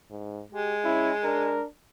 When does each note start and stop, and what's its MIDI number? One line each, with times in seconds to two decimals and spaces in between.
0.11 0.43 44
0.53 1.60 56
0.53 0.75 67
0.85 1.12 61
0.85 1.11 64
1.24 1.66 62
1.24 1.65 70